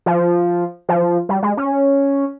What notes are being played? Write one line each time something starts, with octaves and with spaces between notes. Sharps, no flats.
F3
F3
G3
G#3
C#4